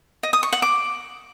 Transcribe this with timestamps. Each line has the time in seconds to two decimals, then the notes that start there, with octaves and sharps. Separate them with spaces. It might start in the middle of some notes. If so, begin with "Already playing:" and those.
0.23 D#5
0.33 D#6
0.43 C#6
0.53 F#5
0.62 D6